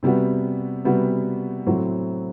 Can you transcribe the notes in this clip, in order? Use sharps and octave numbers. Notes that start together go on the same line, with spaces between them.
C3 G3 B3 F#4
C3 G3 B3 F#4
A2 F#3 C4 F#4